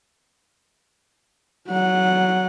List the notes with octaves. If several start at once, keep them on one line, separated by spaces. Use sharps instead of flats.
F#3 F#5